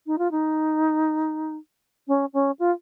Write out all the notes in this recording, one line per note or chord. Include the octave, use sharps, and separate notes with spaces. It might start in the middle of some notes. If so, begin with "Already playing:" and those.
D#4
F4
D#4
C#4
C#4
F4